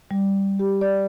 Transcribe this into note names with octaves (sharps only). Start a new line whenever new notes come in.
G3
G4
D5